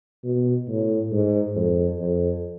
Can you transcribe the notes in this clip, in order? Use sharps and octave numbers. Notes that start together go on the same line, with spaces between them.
B2
A2
G#2
F2
F2